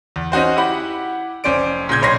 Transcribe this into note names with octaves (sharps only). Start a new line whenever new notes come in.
E2
C#4 D#4 F#4 C5
E4 G4 F#5 B5
F1 C#4 C5 D5 D7
A#2 C#3 G6 G#6
B1 A#2 C#5 C6 A#6 C7